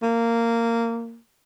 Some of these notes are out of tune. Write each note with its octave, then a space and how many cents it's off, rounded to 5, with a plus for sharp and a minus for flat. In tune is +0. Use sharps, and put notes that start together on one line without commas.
A#3 -15